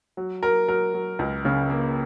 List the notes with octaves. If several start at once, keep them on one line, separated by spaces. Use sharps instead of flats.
F#3
F#3 A#4
F#3 A#4
F#3
C#2
C#3
A#3